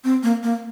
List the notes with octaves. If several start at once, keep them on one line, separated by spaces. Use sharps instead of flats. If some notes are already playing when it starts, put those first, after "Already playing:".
C4
A#3
A#3